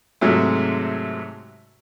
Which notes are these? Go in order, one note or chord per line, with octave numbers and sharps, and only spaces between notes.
G#2 C3 F#3 G#3 A3